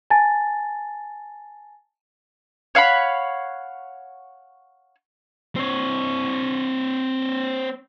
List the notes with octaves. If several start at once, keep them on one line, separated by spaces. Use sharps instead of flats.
G#5 A5 A6
C#5 F5 F#5 B5
C4 C#5